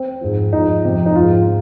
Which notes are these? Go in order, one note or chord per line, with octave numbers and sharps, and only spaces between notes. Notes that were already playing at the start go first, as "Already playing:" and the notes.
Already playing: C4
G#2 F3
G#2 F3 D#4
F2 C3 F3
D#4
G#2 F3 F4